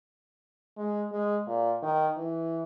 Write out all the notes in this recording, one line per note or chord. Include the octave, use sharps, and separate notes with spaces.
G#3
G#3
A#2
D#3
E3